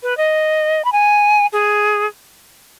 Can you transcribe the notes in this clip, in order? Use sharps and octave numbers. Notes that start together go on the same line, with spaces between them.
B4
D#5
B5
G#5
G#4